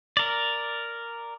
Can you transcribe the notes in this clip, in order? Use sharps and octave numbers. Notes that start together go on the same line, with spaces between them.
A#4 D5